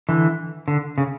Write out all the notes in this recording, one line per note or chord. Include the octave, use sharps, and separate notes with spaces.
D3 E3
D3
C#3